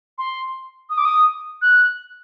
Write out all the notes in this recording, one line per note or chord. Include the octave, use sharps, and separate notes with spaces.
C6
D#6
D6
D#6
F#6